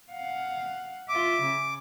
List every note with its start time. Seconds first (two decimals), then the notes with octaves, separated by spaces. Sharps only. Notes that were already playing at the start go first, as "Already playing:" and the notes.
0.11 F5 F#5
1.09 F4 E5 D6
1.41 C#3